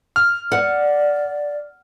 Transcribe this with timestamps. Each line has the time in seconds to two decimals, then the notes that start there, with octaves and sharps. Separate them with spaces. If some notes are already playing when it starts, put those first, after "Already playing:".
0.16 F6
0.52 D5 F#5